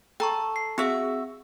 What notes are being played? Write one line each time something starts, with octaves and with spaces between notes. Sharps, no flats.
A4 G5 A#5 C#6
C7
C4 F#4 G#4 E5